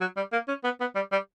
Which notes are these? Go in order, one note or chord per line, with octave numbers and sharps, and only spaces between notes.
F#3
G3
A#3
C#4
B3
B3
G3
G3